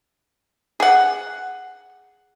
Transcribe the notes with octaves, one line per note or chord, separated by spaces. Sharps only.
G#4 F#5